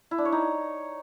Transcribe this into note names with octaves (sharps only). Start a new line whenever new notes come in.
E4
D4
C#5
D#4